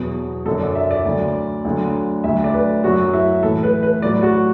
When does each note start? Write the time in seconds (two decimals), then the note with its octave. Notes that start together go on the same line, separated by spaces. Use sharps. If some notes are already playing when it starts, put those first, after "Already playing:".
Already playing: E2 B2 F#3
0.45 F#2 D3 F#3 A4
0.60 D5
0.75 E5
0.91 D5
1.05 D2 D3 F#3
1.65 D2 D3 F#3
2.24 D2 D3 F#3 E5
2.44 D5
2.54 B4
2.84 F#2 F#3 F#4
3.13 E4
3.43 A2 E3 A4
3.63 B4
3.83 B4
4.02 A2 F#3 D5
4.23 F#4